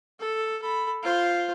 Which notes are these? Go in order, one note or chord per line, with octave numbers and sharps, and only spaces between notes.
A4
A4 B5
F4 C5